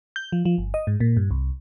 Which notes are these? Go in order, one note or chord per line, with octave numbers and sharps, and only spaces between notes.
G6
F3
F3
G1
D#5
G#2
A#2
G2
C2